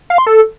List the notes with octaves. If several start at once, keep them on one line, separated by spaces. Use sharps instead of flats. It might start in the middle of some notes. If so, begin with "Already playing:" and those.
F5
C6
A4